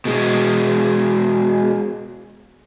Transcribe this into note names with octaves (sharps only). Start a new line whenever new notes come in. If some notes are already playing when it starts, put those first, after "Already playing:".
B2 G#3